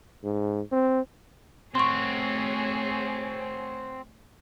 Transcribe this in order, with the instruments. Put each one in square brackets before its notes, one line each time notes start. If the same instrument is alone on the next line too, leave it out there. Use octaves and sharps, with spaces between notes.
[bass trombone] G#2
C4
[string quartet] A3 G#4 C#5 [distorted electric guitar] C4 F#4 [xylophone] C6 C#6